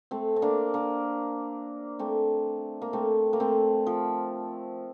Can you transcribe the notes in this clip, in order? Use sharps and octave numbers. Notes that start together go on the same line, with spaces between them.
A3 C4
C4
A#3 D4
A#3 D4
A3 C4
A#3
A3 C4
A#3
A3 C4
F3